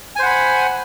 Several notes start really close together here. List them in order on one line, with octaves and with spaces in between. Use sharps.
G#5 C5 F#5 B5